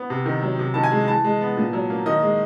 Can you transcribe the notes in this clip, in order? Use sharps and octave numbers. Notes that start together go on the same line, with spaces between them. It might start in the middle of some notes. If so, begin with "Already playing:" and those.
Already playing: B3
C3
D#3
F#3
C3
D#3 A5
G#5
G#3
E3 A5
G#3
B3
A#2
F#3
A#3
D#3 D#5
G#3